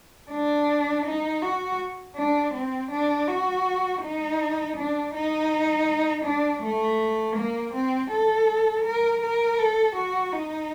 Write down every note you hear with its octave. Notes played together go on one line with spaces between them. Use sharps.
D4
D#4
F#4
D4
C4
D4
F#4
D#4
D4
D#4
D4
A3
A#3
C4
A4
A#4
A#4
A4
F#4
D#4